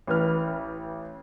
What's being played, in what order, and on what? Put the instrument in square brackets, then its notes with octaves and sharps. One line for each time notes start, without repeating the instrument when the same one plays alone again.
[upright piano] A1 B4 F6